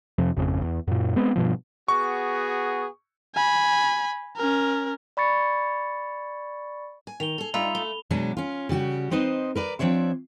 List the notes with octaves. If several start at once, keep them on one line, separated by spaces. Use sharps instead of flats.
F2 C3 F3
G#1 F2 C#3
E2
F#2 A#2
G#3 B3 C4
G2 B2 F3
B3 F#4 G#4 C#6
G#5 B5
C#4 A#4
D5 B5 C#6 A6 C#7
G#5
D#3 F7 G7
G#4 A4
G2 D#4 F4 E5 B5 F7
A3 G7
B2 F#3 G#3 D4
C#4 F4
C#3 G3 F#4 G4
C4 D#4 B4 C5 D#5
A#4 B4 D5
F3 C4 D4 C#5 E5